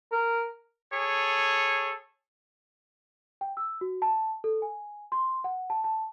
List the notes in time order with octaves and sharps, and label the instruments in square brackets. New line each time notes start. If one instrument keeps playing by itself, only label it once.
[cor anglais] A#4
[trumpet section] G#4 A4 C#5
[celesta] G5
E6
F#4
A5
A4
G#5
C6
F#5
A5
A5